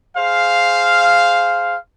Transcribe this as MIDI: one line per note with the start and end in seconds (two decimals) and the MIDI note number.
0.17 1.76 68
0.17 1.76 72
0.17 1.76 77